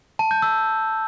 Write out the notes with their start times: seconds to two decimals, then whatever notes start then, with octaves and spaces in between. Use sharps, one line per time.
0.19 A5
0.31 G6
0.42 E6